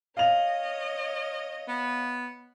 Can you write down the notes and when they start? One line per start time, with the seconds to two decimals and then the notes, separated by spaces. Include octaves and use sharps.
0.17 C#5 D#5 F5 F7
1.68 B3